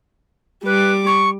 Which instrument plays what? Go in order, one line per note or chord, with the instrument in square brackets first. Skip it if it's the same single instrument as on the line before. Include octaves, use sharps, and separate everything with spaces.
[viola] G3 D6 [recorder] B4
[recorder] C#6